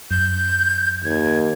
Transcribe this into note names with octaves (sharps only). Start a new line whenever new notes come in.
F#2 G6
D#2 G#6